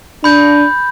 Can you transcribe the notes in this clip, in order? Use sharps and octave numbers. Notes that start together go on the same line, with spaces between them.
D4 B5 G6